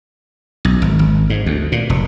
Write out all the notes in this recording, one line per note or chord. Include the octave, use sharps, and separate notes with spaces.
B1
G#1
G#1
G#2
D2
A#2
F1